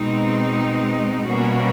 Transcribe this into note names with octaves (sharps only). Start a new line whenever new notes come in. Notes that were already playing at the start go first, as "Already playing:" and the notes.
Already playing: B2 G#3 C4 D#4
B2 G3 A#3 C#4 F#4